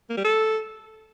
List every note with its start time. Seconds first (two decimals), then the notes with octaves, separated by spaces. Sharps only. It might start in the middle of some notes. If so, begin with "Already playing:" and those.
0.10 A#3
0.17 G3
0.25 A4